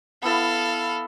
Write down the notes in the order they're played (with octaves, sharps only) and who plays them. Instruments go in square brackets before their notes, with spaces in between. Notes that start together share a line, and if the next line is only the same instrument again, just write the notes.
[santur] B3 E4 [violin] A4 F5